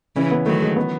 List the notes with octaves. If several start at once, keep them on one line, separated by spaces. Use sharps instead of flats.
C#3 E3 C#4
B3
D#3 F#3 A3
G#3
B3